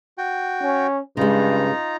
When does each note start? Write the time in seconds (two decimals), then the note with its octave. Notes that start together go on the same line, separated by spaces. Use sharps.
0.18 F#4 G5
0.61 C#4
1.17 G2 C#3 G#3 D#4 F4 A#5